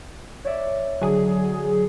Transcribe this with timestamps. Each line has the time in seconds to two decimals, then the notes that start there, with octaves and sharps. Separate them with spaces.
0.45 C#5 D5 E5
1.02 D3 F#3 G#4